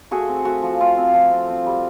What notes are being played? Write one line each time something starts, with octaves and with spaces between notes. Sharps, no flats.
A3 F#4 G#4
C4
A3 F#4
F3
A3 F4
C4
F3
C4
C4
G3